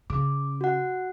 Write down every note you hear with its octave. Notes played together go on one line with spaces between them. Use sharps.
C#3 D6
F#4 F#5